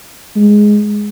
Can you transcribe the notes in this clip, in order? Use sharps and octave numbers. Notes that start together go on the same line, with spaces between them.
G#3